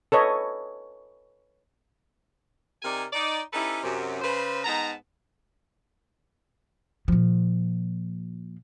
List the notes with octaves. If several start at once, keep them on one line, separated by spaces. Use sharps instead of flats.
A4 B4 C#5 D#5
C3 D#4 A#4 D5 G#5
D#4 D5
C#4 D#4 E4 G4 A4 B4
F#2 C3
C#3 B4 C5
G#2 B3 D#4 A5 A#5
A#2 F3